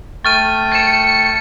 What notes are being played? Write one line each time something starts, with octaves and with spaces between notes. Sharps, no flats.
A3 G5 C#6 F6 A6 D#7
A6 C#7 E7